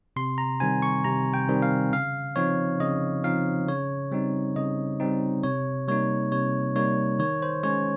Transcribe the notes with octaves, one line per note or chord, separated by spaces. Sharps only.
C3 C6
A#5
D#3 G3 C4 G#5
C#6
C3 A#5
G5
D#3 G3 C4
F5
C#3 F5
F3 C4 D#4 C#5
C#3 D#5
F3 C4 D#4 F5
C#3 C#5
G3 C4 D#4
C#3 D#5
G3 C4 D#4
C3 C#5
G3 A#3 D#4 C#5
C3 C#5
G3 A#3 D#4 C#5
D#3 C#5
C5
G#3 C#4 C#5